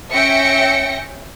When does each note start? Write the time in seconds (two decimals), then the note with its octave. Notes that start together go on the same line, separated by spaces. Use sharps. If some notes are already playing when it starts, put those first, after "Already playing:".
0.12 C#4 E5 G5 A#6 C#7